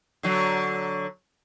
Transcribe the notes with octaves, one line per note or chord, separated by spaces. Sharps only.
D3 F#3